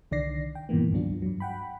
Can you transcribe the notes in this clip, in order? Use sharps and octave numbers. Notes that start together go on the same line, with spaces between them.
C2 D3 D#3 D5 A#6 C7
G5
G2 A#2 D#3 E3 A#3 B3
C#2 G2 F#3 D4 F4
G2 F#3
F#5 G5 B5